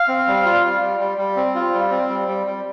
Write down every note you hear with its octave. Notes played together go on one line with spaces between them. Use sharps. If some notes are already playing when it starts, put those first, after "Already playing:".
Already playing: F5
C4
G3
F4
G3
G3
G3
G3
C4
F4
G3
C4
G3
G3
G3